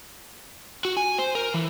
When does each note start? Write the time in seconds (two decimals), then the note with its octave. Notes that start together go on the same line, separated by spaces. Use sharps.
0.85 F#4
0.97 G#5
1.19 C5
1.35 A#4
1.54 E3